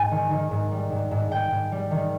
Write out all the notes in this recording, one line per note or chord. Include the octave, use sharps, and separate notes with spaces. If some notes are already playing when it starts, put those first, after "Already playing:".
Already playing: G#2 G#5
D#3
D#3
G#2
G3
G#2
G#2
G#2 G5
G#2
G3
D#3